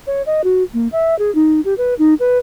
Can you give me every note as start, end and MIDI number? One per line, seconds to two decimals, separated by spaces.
0.07 0.22 73
0.26 0.42 75
0.44 0.63 66
0.74 0.88 58
0.92 1.17 76
1.19 1.33 68
1.35 1.61 63
1.65 1.74 67
1.78 1.94 71
1.99 2.14 63
2.20 2.38 71